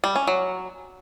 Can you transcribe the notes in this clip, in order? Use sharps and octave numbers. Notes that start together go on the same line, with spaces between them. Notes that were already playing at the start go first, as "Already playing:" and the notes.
G3
C#4
F#3